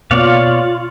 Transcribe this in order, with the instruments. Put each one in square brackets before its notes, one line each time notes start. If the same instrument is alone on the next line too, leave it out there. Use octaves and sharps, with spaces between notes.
[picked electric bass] B2 A#3 B3 [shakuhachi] F4 [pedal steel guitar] C#5 D5 F5